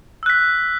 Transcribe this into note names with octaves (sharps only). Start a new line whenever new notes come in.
E6 F#6 B6